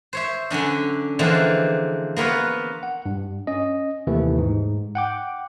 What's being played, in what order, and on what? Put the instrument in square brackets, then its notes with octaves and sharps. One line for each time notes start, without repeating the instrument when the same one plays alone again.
[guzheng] C5 C#5 E5
D3 F#3 C#4 D4
D3 E3 F3 G#3 A#3 C4
A#3 B3 F4 B4 C#5
[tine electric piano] F#5
G2
C#4 D#5
D#2 C3 E3 A3
G#2
F#5 G5 D6